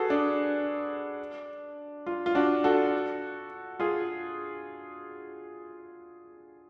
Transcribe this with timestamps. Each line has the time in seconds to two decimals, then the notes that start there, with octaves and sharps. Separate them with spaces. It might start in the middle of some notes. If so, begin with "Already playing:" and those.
Already playing: F#4 G#4 A4 B4
0.10 D4
2.06 F4
2.26 F4
2.35 D4 F#4
2.64 F#4 A4
3.80 F4 G#4